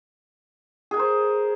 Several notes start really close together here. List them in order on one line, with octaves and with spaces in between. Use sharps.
G#4 G#5 A#4 C5